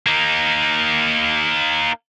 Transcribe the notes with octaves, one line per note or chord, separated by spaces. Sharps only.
A#3 D#4